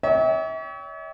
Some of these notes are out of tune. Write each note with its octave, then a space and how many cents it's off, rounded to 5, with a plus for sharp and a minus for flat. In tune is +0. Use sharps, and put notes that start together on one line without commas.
C#5 +35 E5 -40 G5 +0